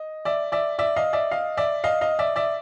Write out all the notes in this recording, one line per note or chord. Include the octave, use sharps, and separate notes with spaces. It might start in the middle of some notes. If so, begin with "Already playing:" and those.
Already playing: D#5
D5 E5
D5 E5
D5 E5
D#5 F5
D5 E5
D#5 F5
D5 E5
D#5 F5
D#5 F5
D5 E5
D5 E5